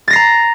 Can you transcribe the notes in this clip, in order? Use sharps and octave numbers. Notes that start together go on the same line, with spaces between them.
A#5 A6 A#6 C7